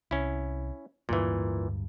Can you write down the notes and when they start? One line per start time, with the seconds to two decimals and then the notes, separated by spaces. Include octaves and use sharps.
0.11 C2 C#4 E4
1.09 D1 D2 G2 A#2 E3